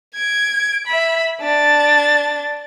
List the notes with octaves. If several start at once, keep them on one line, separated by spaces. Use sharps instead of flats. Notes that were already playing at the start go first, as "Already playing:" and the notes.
G#6 D7
E5 B5
D4 A6